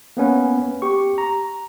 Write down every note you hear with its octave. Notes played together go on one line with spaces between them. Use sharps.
A#3 B3 C#4 B4
G4 C#6
A#5